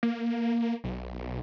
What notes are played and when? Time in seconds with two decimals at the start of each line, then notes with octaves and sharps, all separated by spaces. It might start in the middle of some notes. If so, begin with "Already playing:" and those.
0.03 A#3
0.84 B1